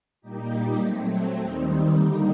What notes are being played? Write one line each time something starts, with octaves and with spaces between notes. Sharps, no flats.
A#2 G3 A#3 D#4 G4
F#3 A3 C4
D#2 D#3 G3 C4 D#4
D3 G3 A#3 D#4